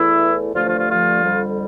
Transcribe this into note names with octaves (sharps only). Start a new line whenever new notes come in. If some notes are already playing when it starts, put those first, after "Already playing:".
Already playing: E2 E3 A3 E4
G2 D3 F3 A3 F4
F3 F4
F3 F4
F3 F4
F2 D3 G3